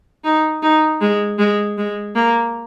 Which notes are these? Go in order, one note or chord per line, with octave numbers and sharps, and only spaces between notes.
D#4
D#4
G#3
G#3
G#3
A#3